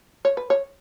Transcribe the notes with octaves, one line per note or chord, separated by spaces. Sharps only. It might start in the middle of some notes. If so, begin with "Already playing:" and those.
C#5
B4
C#5